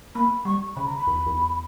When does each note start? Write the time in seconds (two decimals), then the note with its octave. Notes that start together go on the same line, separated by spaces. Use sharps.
0.15 A#3 B5
0.45 G3 C#6
0.76 C#3 B5
0.86 A#5
0.97 B5
1.07 E2
1.26 E2